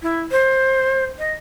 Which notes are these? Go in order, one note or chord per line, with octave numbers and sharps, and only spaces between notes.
E4
C5
D#5